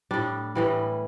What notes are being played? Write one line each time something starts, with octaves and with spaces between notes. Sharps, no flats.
A2 G3 D4
A2 E3 G3